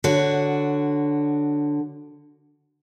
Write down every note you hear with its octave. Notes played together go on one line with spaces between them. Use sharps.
D3 F#4 C#5